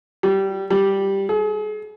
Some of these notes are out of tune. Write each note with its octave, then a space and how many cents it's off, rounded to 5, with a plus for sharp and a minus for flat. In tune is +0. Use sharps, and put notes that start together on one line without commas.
G3 -15
G3 +0
G#4 +40